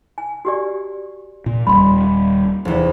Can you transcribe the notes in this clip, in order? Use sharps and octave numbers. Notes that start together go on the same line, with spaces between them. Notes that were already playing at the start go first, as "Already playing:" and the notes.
G#5
F#4 G4 D5
A#2
D#1 B1 G3 B5 C6
F1 E2